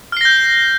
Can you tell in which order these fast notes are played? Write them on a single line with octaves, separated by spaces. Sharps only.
F6 C7 A#6 G6